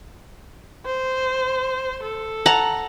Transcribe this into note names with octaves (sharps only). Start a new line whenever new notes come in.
C5
A4
F#5 A5 A#5